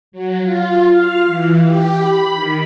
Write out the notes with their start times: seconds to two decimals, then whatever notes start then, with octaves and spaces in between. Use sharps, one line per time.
0.12 F#3
0.43 F4
0.90 F5
1.25 E3
1.64 G4
1.99 B5
2.34 D#3